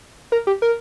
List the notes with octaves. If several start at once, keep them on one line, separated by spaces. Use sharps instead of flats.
A#4
G4
A#4